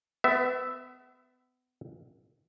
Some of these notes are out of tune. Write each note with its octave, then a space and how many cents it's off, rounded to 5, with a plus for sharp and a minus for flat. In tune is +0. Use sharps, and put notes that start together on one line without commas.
B3 +35 E5 +0